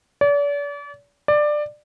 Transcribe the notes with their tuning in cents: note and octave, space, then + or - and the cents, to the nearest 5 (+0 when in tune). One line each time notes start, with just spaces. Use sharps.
D5 -40
D5 +15